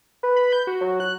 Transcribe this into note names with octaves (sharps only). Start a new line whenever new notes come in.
B4
B5
G6
F#4
F#3
F#6